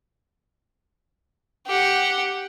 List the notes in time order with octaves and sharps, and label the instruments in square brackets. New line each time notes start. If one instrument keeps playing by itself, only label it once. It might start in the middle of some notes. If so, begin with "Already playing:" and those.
[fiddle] G4 F#5